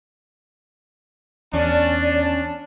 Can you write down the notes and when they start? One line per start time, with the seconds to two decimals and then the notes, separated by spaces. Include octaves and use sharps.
1.54 E2 C#4 D4 D5